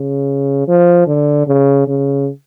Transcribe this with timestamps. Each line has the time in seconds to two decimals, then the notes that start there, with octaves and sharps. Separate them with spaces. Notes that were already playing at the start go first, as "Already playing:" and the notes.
Already playing: C#3
0.68 F3
1.07 D3
1.47 C#3
1.88 C#3